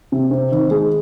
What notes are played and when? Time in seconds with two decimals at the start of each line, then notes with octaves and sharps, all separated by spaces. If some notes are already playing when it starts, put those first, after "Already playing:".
0.12 C3
0.31 C4
0.52 D#3
0.71 G#3